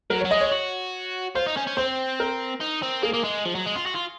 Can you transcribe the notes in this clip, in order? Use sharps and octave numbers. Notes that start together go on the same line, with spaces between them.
F#3 A#4
F#3 C#5
G#3 D#5
C#5
F#4
F4 C5
D#4
C#4
C#4
C4 C5
A#4
D#4
C4
A#3 G#4
A#3
G#3
F3
F#3
G#3
F4
F#4
F4